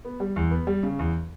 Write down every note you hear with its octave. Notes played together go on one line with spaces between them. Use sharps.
B3
G3
E2
B3
G3
C#3
E2